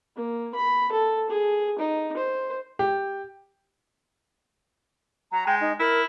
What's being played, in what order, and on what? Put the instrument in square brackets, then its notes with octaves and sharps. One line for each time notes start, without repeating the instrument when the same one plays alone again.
[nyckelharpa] A#3
B5
A4
G#4
D#4
C5
[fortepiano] G4
[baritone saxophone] F#3 [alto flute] A#5
[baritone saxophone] G#3 [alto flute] G5
[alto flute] D#4
[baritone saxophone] E4 [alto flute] A#4